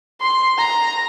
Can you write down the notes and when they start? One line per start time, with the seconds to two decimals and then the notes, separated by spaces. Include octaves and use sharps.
0.21 C6
0.58 A#5